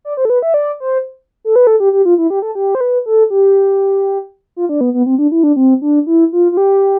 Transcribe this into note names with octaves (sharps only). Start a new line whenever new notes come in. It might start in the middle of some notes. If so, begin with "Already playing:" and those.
D5
C5
A4
B4
E5
D5
C5
A4
B4
A4
G4
G4
F4
E4
G4
A4
G4
C5
B4
A4
G4
F4
D4
B3
B3
C4
D4
E4
D4
C4
D4
E4
F4
F4
G4